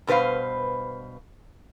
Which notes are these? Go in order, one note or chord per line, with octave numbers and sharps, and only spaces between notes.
G2 B2 B4 C5 F5